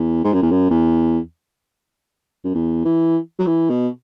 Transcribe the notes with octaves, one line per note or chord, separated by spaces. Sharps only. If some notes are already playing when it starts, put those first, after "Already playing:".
Already playing: E2
G#2
F#2
E2
F#2
E2
F#2
E2
E3
F#3
E3
B2